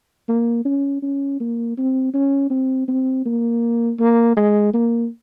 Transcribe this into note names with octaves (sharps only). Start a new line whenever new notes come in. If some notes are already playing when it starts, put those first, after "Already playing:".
A#3
C#4
C#4
A#3
C4
C#4
C4
C4
A#3
A#3
G#3
A#3